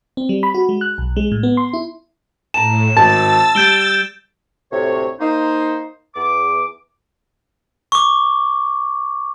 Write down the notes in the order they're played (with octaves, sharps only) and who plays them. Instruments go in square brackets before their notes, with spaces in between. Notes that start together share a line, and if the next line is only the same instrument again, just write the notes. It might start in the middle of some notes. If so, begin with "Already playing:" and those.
[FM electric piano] C4
G3
B5
F#4
G#3
F#6
B1
G#3
A2
B3
C6
E4
[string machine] A2 [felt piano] A5 A#5 [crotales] E7
[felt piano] G#1 [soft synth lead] A5 [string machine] E6 A6
[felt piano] G3 [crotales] G6 D7 G7
[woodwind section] D2 A2 C3 C#5
A#3 D#4 C5
E2 D6
[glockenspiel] C#6 D6